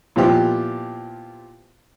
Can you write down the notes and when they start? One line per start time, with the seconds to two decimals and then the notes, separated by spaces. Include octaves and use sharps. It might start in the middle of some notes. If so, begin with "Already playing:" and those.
0.16 A#2 F3 B3 E4 F4 G4